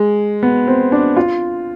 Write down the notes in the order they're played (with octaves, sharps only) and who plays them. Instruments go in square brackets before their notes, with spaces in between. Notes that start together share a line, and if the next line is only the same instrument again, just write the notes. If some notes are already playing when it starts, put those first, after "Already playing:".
Already playing: [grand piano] G#3
B3
C4
D4
F4